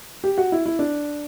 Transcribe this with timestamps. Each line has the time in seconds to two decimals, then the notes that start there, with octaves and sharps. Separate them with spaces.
0.24 G4
0.38 F#4
0.52 E4
0.66 E4
0.79 D4